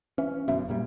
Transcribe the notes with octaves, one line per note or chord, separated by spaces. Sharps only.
E3 C#4
G1 F#2 B2 E4
F#2 A#2 G3